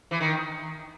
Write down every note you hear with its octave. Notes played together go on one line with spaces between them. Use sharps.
E3
D#3